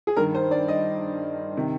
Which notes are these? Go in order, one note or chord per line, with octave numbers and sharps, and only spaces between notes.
G#4
G2 D#3 A#4
C5
D5
D#5
C3 D#3